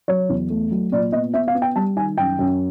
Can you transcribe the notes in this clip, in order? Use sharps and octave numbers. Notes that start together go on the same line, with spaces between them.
F#3 C#5
E2
A3
F#3
A#2 D5
B3 D#5
B3 E5
F5
B3
G5
G3 A5
D#3 G#5
F#2 G5
F#2